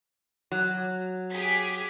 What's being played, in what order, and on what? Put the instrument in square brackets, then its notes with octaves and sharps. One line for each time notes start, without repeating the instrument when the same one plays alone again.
[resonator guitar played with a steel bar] F#3
[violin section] G4 G#4 B6